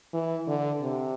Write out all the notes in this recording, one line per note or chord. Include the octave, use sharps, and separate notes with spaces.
E3
D3
C3